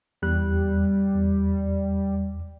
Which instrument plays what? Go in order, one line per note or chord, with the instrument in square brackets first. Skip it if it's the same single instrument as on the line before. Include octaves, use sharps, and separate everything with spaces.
[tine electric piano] E2 F#6 [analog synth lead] G3
[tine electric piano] E2